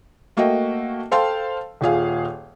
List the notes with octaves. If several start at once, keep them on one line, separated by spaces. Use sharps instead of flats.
A3 A#3 F#4 D#5 G5
A4 C5 F5 G5 A5 C6
D#1 A#2 G#4 F5